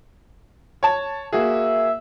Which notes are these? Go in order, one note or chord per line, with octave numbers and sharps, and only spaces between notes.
C#5 A5
A#3 F#4 G#4 E5